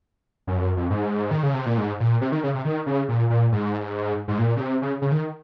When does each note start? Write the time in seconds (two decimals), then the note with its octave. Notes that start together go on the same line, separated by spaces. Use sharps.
0.47 F#2
0.57 F2
0.61 F#2
0.77 F2
0.90 G#2
1.31 D#3
1.43 C#3
1.54 C3
1.66 A#2
1.78 G#2
2.00 A#2
2.21 C3
2.32 D#3
2.44 C#3
2.54 C3
2.65 D#3
2.86 C#3
3.09 A#2
3.30 A#2
3.52 G#2
4.28 G#2
4.39 A#2
4.57 C#3
4.60 C3
4.82 C#3
5.02 C#3
5.11 D#3